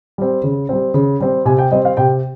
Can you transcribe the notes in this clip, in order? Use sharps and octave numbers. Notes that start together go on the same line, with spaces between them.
G3 C4
C#3
G3 C4
C#3
G3 C4
C3 G#5
G5
G3 C4 D#5
F5
C3 G5